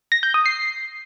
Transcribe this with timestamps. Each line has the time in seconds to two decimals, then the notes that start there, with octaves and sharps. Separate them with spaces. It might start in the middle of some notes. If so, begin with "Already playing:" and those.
0.12 A#6
0.23 G6
0.34 D#6
0.46 C7